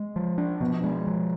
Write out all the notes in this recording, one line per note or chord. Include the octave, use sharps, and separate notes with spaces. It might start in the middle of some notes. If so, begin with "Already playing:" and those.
Already playing: G#3
F3
D4
B2 F3
G#3
F3